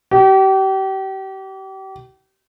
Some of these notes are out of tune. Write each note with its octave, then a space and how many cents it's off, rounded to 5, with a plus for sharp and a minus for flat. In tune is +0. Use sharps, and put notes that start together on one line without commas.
G4 -35